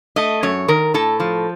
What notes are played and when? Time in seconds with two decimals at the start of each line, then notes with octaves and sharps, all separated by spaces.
0.16 A3 D#5
0.43 F#2 C#5
0.68 D#3 A#4
0.94 A2 A4
1.20 F3